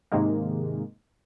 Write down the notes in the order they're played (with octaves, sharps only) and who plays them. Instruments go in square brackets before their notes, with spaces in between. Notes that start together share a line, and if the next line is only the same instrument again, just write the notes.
[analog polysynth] G#2 C3 D#3 G#3 A#3